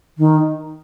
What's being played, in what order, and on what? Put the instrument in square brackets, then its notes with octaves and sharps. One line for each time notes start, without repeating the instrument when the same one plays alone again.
[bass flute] D#3